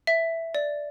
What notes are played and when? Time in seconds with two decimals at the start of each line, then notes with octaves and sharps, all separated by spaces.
0.07 E5
0.55 D5